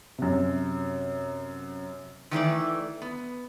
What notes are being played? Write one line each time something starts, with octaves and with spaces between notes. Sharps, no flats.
F#2 C3
D#3 E3 A3 D5
B3